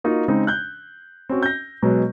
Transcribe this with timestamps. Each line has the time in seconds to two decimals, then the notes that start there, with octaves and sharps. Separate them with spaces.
0.04 A#3 D#4 F4 F#4
0.28 C#3 G#3 C4 D#4
0.47 F#6 G6
1.29 C4 C#4 F#4
1.43 G6 A#6
1.83 B2 F#3 G#3 B3